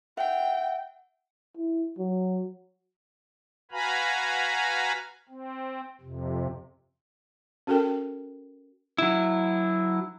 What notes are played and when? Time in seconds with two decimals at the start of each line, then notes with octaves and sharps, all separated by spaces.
0.18 E5 F#5 G5
1.57 E4
1.98 F#3
3.72 F#4 B4 F5 G#5 A#5 B5
5.29 C4
6.01 F2 C3
7.67 C#4 F#4 A4 A#4 G5
8.98 F#3 E4